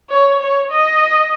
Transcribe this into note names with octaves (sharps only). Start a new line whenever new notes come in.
C#5
C#5
D#5